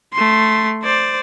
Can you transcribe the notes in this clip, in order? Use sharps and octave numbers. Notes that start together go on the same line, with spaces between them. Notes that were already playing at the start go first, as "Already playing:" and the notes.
A3 C6
C5 D5